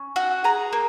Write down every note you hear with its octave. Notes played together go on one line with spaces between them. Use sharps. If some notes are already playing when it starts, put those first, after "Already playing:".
Already playing: C#4
F#4
G#4 A#5
A#3